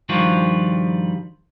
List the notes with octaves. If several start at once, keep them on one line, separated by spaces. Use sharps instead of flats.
G2 D#3 F3 G3 F4 F#4